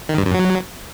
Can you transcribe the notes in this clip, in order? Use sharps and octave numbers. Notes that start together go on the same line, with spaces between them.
D#3
G2
F#2
F#3